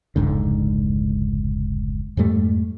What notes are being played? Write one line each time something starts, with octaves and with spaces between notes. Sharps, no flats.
F1 C#2 G#2 D3
F2 G#2 G3 A3